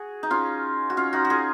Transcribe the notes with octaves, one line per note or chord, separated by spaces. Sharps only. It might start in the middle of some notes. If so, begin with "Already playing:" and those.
Already playing: F#4 G#4
D#4
C#4 F4
F#4
C#4 F4
D#4 F#4
F#4
F4 G#4